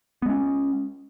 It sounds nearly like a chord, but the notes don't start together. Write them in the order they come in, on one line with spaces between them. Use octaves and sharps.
B3 G#3 C#4